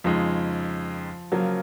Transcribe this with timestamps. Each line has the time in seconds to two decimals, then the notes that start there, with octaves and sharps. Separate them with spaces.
0.04 F2 C#3 F3 G#3 D#4
1.32 C#3 F3 F#3 A#3